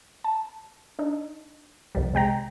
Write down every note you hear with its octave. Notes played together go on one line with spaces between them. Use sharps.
A5
D4 D#4
C2 F2 G3
C3 G#3 G5 A#5